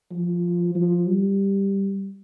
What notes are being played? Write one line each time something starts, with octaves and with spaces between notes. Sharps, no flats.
F3
F3
G3